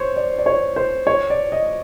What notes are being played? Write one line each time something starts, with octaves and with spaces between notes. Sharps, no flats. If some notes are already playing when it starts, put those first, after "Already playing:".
Already playing: C5 C#5
D5
D5
C#5
C5
C#5
D5
D#5